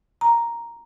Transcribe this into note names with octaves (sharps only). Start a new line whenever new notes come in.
A#5